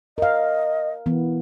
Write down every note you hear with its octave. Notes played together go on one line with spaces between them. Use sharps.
A#4 D#5 F5
E3 B3